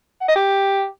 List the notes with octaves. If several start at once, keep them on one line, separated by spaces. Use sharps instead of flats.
F#5
D#5
G4